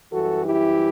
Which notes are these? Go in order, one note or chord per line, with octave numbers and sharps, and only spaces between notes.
F#2 E3 G3 F#4 A4
E4 G4